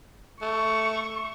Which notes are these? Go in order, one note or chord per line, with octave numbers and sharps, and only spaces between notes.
A3 C#6